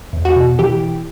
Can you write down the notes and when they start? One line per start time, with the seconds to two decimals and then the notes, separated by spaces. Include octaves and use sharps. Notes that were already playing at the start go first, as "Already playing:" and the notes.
0.13 E2
0.25 F#4
0.36 B2
0.59 E3 G4